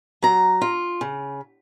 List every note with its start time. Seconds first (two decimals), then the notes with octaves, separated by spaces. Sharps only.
0.22 F#3 A#5
0.61 F4
1.01 C#3